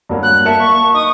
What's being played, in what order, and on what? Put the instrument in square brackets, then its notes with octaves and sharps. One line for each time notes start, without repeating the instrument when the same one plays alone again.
[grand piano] G2 F#3 A#3
[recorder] F#6
[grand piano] A#3 A5 C#7 [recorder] E5
[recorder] C#6
[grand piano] D#4 [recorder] D#6